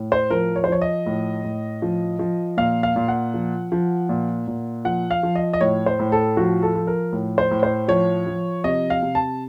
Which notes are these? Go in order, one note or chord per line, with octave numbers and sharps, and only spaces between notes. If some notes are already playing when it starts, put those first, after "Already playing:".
Already playing: A2
C5
F3 A#4
C#5
C5
F3 C#5
D#5
A2
A2
F3
F3
A#2 F5
F5
A#2
F#5
F3
F3
A#2
A#2
F3 F#5
F5
F3
D#5
D#5
A2 C#5
C5
A2
A4
F3 F#4
A4
F3
A#4
A2
C5
A2
C5
F3 C#5
F3
C3 D#5
F5
C3
A5